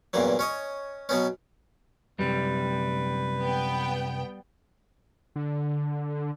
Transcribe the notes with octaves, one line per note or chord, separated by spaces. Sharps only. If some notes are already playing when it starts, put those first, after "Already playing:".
E2 G2 A#2 E3 F#3
C#4 C#5 D#5
B2 F#3 B3 C#4
F#2 C3 G3 B4
B3 G5
D3